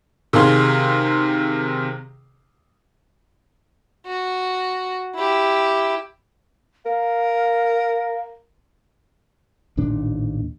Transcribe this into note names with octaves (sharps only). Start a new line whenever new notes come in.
C3 D#3 G#4 F5 C6
F#4
E4 G4
A#4 F5
A1 D#2 A#2 D4